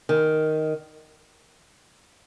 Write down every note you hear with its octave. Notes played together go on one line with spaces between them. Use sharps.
D#3